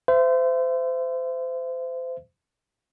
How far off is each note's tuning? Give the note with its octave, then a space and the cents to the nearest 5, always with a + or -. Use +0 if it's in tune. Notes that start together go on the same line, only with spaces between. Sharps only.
C5 -30 E5 +30